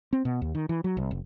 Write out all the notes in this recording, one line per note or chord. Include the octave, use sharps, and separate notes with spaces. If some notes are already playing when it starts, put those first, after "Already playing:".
C4
B2
D#2
D#3
E3
F#3
C2
F#1